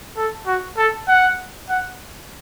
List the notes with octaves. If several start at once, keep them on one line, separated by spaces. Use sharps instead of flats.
A4
F#4
A4
F#5
F#5